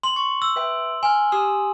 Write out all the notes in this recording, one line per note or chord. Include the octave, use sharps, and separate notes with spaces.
C6 F#7
C#6
E6
B4 E5 G5
G#5 C6 F6
G4 D#6 E6